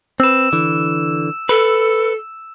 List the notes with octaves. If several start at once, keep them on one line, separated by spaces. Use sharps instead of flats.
C4 B4 E6 E7
D3 E3
A4 B4